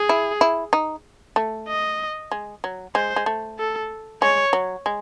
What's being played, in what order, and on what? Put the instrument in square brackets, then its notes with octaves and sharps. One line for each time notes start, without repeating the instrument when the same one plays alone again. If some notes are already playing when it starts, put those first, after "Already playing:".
Already playing: [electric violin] G#4
[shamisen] E4
E4
D#4
A3
[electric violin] D#5
[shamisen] G#3
F#3
[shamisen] G#3 [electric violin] C5
[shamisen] G#3
A3
[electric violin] A4
[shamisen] G#3 [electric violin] C#5
[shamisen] F#3
G#3